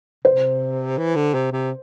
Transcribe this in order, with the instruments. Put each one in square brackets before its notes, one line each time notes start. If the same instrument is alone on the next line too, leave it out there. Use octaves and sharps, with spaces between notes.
[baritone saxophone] C3 [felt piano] C5
[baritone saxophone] E3
D3
C3
C3